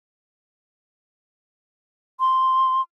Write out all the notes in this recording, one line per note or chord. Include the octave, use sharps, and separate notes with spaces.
C6